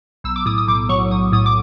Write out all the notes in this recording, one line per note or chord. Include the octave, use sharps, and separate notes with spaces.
B1 E6
D6
A2 D#6
D#6
B1 D6
F#3 C#6
B1 D#6
A2 D#6
D6